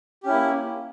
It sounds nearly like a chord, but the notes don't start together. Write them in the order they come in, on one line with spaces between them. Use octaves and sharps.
G4 C#4 E4 A#3